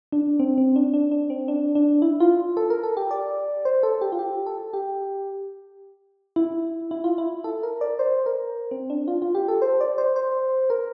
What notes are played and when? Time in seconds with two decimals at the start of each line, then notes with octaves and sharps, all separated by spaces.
0.12 D4
0.39 C4
0.58 C4
0.76 D4
0.94 D4
1.12 D4
1.30 C4
1.48 D4
1.75 D4
2.02 E4
2.20 F4
2.57 A4
2.70 A#4
2.83 A4
2.97 G4
3.11 D5
3.65 C5
3.83 A4
4.01 G4
4.12 F4
4.19 G4
4.47 A4
4.73 G4
6.36 E4
6.91 E4
7.04 F4
7.18 E4
7.44 A4
7.63 A#4
7.81 D5
7.99 C5
8.26 A#4
8.71 C4
8.90 D4
9.08 F4
9.22 F4
9.35 G4
9.48 A4
9.62 C5
9.81 D5
9.98 C5
10.16 C5
10.70 A#4